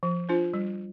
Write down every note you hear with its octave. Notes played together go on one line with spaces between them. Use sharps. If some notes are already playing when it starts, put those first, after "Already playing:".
F3
D4 F4 C5
G3